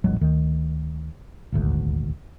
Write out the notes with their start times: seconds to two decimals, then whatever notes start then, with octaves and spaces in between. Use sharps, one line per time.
0.04 D#1 A1 F#3 G#3
0.21 D2 D#3
1.52 D#1 G#1 D2